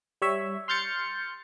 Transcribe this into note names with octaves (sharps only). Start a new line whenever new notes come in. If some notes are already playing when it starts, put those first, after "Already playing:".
G3 C#5 E5
C6 F6 G6 A6 C#7